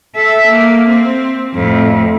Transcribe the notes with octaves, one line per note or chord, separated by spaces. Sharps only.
A4 E5
A#3
C4
F2 A2